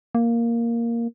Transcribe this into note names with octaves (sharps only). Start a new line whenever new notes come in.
A#3